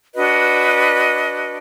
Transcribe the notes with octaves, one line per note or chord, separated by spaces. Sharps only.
D4 F#4 B4 D#5